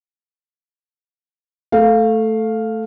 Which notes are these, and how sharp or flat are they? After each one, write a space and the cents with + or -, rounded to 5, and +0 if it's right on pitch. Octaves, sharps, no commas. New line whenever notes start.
A3 +0 A4 +0 F5 +0